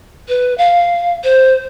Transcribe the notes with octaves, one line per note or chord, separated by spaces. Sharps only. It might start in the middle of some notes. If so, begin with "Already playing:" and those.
B4
F5
C5